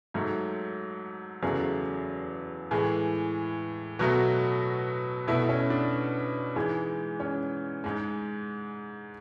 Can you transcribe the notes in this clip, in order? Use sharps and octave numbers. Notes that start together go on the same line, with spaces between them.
G#2 F#3 A3
E2 C#3 F#3 A3 G#4
A2 E3 G#3 G#4
B2 F#3 A3 F#4
B2 A3 E4
C#4
D4
G#2 E3 G#3
C#4
G#2 G#3